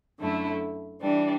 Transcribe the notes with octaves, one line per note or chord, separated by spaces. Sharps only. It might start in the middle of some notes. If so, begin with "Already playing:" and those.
F#2 D3 A3 E4
E3 G3 D4